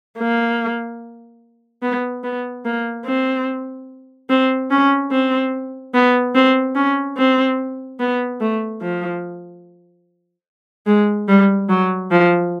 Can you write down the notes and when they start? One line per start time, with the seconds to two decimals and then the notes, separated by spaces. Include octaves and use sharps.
0.18 A#3
1.82 B3
2.24 B3
2.65 A#3
3.05 C4
4.30 C4
4.70 C#4
5.11 C4
5.94 B3
6.35 C4
6.75 C#4
7.17 C4
8.00 B3
8.40 A3
8.81 F3
10.87 G#3
11.28 G3
11.69 F#3
12.11 F3